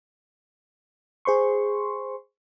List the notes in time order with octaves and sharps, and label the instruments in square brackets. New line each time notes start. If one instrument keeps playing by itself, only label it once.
[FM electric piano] G#4 C5 C6 C#6